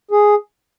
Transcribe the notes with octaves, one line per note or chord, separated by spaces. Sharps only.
G#4